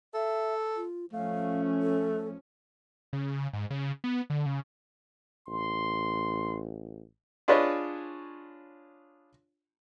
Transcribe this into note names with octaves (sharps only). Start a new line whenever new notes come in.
A4 E5
F4
F3 A3 C#4 F5
A4
C#3
G#2
C#3
B3
D3
C#3
A1 C6
D4 F4 G#4 B4 C#5 D#5